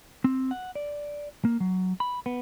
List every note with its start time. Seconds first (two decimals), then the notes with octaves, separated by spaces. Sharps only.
0.24 C4
0.51 F#5
0.75 D5
1.45 A#3
1.60 F#3
2.00 B5
2.26 B3